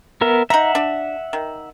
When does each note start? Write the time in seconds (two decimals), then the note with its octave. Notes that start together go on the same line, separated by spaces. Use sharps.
0.21 B3 A#4 E5
0.50 D#4 E5 F#5 A#5
0.75 D4
1.33 D#3